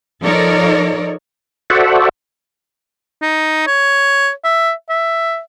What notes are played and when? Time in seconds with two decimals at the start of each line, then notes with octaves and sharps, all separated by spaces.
0.24 F3 D#4 A4 A#4 C#5 D5
1.70 F#4 A4 C5 D5 E5 F#5
3.22 D#4
3.67 C#5
4.44 E5
4.89 E5